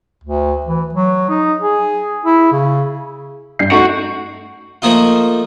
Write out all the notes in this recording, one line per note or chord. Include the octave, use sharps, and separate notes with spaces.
D2
E3
F#3
D#4
G#4
E4
C#3
G2 G6 C7
A3 D#4 F#4
F3 A3 A#3 D#4 F4